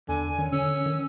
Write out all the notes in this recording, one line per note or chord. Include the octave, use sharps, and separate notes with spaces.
E2 D3 G#5
D#3 C#4
D3 C#4 E6
D#3